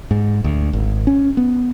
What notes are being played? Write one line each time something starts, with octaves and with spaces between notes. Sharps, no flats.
G#2
D2
G#1
C#4
B3